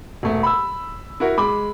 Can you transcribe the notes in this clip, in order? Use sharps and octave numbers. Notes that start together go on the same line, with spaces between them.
E1 A3
B5 E6
E4 F#4 A#4
G#3 B5 D6